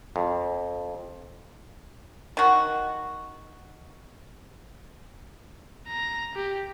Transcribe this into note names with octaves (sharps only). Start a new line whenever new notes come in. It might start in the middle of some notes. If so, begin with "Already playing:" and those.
F2
D#3 F#4
A#5
G4